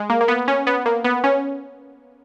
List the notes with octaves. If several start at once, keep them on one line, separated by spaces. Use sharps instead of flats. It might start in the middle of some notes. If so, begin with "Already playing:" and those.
Already playing: G#3
A#3
A#3
B3
C#4
B3
A#3
B3
C#4